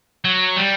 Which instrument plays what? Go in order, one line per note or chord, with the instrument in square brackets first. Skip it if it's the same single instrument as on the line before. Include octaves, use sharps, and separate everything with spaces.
[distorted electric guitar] F#3
G3